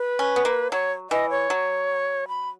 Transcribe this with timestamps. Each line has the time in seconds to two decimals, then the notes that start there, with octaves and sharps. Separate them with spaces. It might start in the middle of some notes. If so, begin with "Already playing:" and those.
Already playing: B4
0.19 C#4
0.36 B3
0.45 A#3
0.72 F#3 C#5
1.11 E3 D#5
1.30 C#5
1.50 F#3
2.28 B5